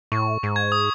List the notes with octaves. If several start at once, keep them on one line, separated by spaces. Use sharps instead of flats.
A2 C#6
G#2
G#6
D#6